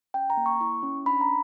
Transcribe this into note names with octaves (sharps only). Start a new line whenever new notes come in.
C#4 G5
A#5
A#3
C#6
E4 C#6
C#4
D4 B5
A#5